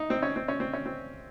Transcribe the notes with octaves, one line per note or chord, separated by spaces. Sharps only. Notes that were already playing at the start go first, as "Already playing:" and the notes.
Already playing: D#4
C4
C#4
C4
C#4
C4
C#4
C4